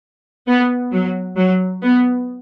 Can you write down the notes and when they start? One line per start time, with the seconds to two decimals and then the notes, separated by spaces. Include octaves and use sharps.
0.47 B3
0.92 F#3
1.37 F#3
1.82 B3